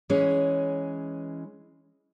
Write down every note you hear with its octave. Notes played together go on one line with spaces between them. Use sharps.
E3 G#3 C#4